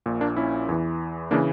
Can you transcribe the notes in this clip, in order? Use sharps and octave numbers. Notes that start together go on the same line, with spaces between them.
A#1 A#2
A#3 D4
C#4 E4
E2 E3
C#3 E3 A#3 D4